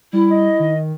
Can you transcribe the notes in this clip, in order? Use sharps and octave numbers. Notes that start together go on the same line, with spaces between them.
G3 E4
D#5
D#3